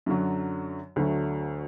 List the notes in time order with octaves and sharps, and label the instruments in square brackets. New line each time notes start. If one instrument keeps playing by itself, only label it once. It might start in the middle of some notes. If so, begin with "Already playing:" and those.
[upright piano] F#2 D3 F#3
D2 D3 F#3 A3